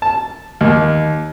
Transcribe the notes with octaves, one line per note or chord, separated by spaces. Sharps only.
A5
D#2